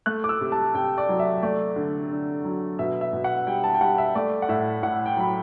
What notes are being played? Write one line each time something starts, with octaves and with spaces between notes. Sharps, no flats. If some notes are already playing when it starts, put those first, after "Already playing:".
A3 F#6
D6
E6
C3
A5
C3 G5
D5
F#3
E5
A3 D5
D3
D3
F#3
B2 E5
E5
B2
F#5
G3 G5
A5
G5
G3 F#5
E5
A3 D5
F#5
A2 E5
A2 F#5
G5
F#3 B5